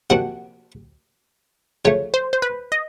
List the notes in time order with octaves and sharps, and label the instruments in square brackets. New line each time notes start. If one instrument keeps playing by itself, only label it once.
[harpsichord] C3 F3 A#3 D4 F#4 [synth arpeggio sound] F#5
[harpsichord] C#3 F3 A3 [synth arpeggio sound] C#5
[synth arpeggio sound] C5
C5
B4
D#5